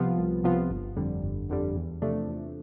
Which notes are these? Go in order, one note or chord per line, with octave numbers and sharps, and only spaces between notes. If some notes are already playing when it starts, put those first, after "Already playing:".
Already playing: C2 C3 F3 B3 F4
C2
C3 F3 B3 F4
G1
F2 D3 G3
G1
F2 D3 G3
E2
C3 F3 A3 D4
E2